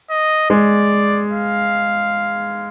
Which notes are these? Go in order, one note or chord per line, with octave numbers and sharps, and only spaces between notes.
D#5
G#3 D5
F5